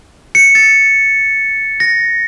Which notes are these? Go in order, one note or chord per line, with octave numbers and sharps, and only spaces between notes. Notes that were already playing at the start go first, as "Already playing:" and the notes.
C#7
A6
A#6